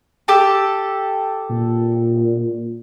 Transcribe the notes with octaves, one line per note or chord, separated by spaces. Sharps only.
G4 A4
A#2